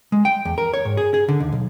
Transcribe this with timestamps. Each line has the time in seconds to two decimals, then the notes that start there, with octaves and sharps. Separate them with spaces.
0.12 G#3
0.25 G5
0.45 E2
0.58 A#4
0.74 C#5
0.85 G#2
0.97 G#4
1.14 G#4
1.28 D3
1.40 D#2
1.52 B1